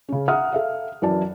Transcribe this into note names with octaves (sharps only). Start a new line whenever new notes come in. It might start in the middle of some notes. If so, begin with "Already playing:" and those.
C#3 C#4
E5 F#5 A#5 D#6 F6
A4 E5 F5
F#2 E3 E4 D5 A5